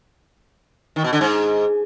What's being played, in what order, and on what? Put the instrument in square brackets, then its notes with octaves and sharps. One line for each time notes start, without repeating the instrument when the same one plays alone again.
[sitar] D#3
B2
D3
G#2